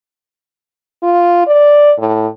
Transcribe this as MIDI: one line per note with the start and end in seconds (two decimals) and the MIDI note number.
1.03 1.47 65
1.47 1.93 74
1.99 2.27 45